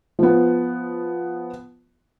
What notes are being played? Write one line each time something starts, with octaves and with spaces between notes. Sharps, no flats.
F3 B3